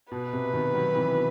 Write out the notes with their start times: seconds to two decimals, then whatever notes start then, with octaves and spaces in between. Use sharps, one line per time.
0.12 B2 B4
0.33 C3
0.53 B2 D#3
0.74 D#3 F#3
0.94 C3 E3
1.15 B2